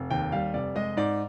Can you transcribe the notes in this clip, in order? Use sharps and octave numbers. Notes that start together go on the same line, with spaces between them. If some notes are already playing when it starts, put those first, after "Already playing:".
Already playing: F1
D#2 G5
G3 F5
F1 D5
G#3 D#5
G#2 D5